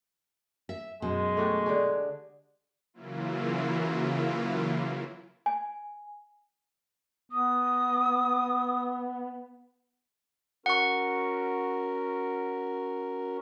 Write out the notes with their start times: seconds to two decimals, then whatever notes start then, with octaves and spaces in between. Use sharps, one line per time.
0.69 E5
1.02 F#2 B2 G#3
1.37 A3 F#4 G4
1.66 D3 G4 G#4
2.94 C#3 E3 F#3 A#3 E4 F4
5.46 G#5
7.32 B3 D#6
10.66 C#4 F#4 A#4 F#5 C#6